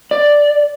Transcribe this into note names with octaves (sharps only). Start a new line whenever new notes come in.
D5